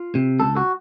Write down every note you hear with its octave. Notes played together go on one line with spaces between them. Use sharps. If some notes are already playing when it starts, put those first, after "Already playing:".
Already playing: F4
C3
C#2 A4
F#4